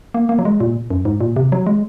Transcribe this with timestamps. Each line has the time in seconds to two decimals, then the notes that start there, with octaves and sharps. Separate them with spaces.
0.14 A#3
0.29 A#3
0.39 F#3
0.45 G#3
0.60 A#2
0.90 F#2
1.05 G#2
1.21 A#2
1.36 C3
1.52 F#3
1.67 G#3